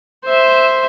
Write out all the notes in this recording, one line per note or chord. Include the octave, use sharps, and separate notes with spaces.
C5 E5